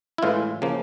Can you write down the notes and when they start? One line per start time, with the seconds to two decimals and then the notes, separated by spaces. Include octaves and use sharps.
0.18 E4
0.23 A2 E3 G#3 F4
0.62 C#3 F3 A#3